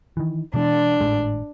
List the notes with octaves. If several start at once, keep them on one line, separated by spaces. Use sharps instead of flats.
D#3 E3
B2 E3 G#3 D4
G#1 A2 G#3